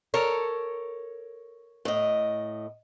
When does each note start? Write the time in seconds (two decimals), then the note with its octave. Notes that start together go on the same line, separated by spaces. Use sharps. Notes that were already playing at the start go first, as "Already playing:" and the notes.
0.14 A4 A#4 C#5
1.85 A2 D#5